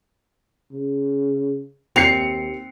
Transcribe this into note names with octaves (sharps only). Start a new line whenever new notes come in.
C#3
D#2 C4 C7 C#7 F7